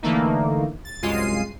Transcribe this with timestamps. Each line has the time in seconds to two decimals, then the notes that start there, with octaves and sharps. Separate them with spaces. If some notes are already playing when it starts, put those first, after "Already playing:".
0.03 D3 E3 A3 A#3 D#4
0.85 A6
1.03 C2 F#2 G#3 F4 C7 D#7